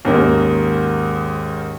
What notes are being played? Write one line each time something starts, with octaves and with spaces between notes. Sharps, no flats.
D#2 G#2 D#3 A#3 C#4